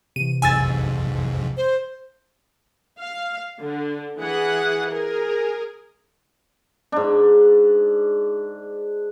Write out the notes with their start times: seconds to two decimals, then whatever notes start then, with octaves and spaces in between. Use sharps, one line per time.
0.16 C3 E3 D#7
0.42 B1 F2 G#2 G#5 E6 A6
1.57 C5
2.99 F5
3.60 D3
4.18 E3 G#4 F#5
4.90 G#4 A#4
6.92 G#2 D4